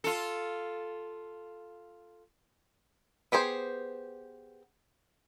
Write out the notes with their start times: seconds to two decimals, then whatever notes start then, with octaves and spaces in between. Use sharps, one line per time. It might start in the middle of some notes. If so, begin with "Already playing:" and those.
0.04 F4 A4
3.32 B3 G4 G#4 C5